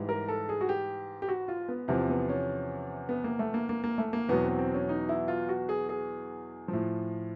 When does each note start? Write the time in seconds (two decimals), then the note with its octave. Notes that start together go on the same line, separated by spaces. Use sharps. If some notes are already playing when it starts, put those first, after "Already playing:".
Already playing: G#2 E3 G3
0.09 A#4
0.28 A4
0.49 G#4
0.61 F#4
0.69 G4
1.22 G4
1.28 F#4
1.48 F4
1.69 B3
1.88 E2 C3 F3
2.09 B3
2.29 C#4
3.09 B3
3.24 A#3
3.39 A3
3.54 A#3
3.69 A#3
3.84 A#3
3.98 A3
4.13 A#3
4.29 E2 B2 F#3 B3
4.43 C4
4.59 C4
4.74 C#4
4.89 D#4
5.09 E4
5.28 F4
5.49 F#4
5.69 G#4
5.89 G#4
6.68 A2 F3